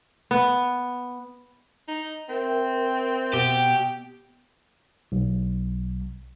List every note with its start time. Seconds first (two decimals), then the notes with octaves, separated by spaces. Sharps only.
0.31 B3
1.88 D#4
2.29 C4 A#4 E5
3.34 B2 G4
5.12 B1